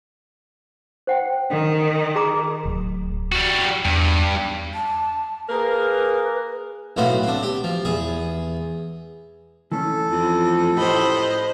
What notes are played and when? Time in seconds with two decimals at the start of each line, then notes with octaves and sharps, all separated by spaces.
1.07 C5 F#5 G5
1.50 D#3
2.16 G#4 A#5 D6
2.65 D1
3.32 G3 F#4
3.85 E2 G2
4.74 A5
5.49 A#3 G#4 A#4 B4
6.97 B1 A2 B3 F#4 C5 F5
7.23 C4 D4
7.43 G4
7.64 F3
7.85 E2 G#4
9.72 E3 A3 C#4 A4
10.11 F2
10.77 A2 G4 C5 D#5 B5